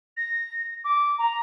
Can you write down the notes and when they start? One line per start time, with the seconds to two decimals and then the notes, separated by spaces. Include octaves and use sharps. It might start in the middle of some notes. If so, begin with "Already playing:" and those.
0.17 A#6
0.84 D6
1.18 A#5